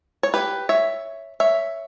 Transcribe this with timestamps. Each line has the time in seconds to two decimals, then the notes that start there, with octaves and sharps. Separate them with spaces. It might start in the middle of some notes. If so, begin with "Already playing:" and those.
0.23 C#5
0.34 G4 B4
0.69 C#5 E5
1.40 C#5 E5